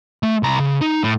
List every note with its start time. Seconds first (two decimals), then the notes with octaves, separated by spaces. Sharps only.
0.23 A3
0.43 C2 A#5
0.60 C#3
0.81 D#4
1.04 A2